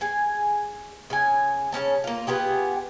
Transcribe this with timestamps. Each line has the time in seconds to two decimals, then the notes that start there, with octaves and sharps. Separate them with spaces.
0.01 G#4 G#5
1.10 C#3 G#5
1.72 C#3 C4 C#4 A5
2.04 A#3 F4
2.27 B3 F4 G4 G#4